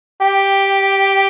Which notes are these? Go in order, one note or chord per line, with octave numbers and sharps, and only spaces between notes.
G4